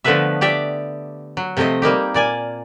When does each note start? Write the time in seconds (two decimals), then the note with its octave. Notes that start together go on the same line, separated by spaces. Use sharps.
0.04 D3 F3 A3 B3 B4 E5
0.41 G4 D5 E5 G5
1.37 F#3
1.57 C3 F3 A3 C4 D#5
1.82 G3 A#3 D#4 G4
2.14 A#2 D5 G#5